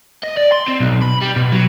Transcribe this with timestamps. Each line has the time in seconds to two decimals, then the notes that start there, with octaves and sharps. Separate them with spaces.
0.24 D#5
0.37 D5
0.52 C6
0.68 C4
0.80 B1
1.02 B5
1.21 G3
1.36 B2
1.52 F#3